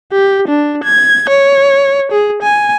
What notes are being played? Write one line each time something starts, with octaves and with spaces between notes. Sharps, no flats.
G4
D4
G#6
C#5
G#4
G#5